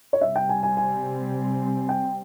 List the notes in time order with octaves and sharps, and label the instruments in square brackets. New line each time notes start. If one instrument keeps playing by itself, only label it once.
[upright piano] C#5
[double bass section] C3 G3 C4 [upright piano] E5
[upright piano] G5
G#5
G#5
G#5
G5